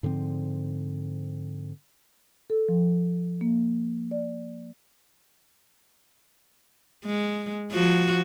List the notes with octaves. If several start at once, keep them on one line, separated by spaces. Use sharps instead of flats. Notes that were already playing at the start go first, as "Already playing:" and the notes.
G#2 D3 F3 C4
A4
F3
A#3
D5
G#3
F3 F#4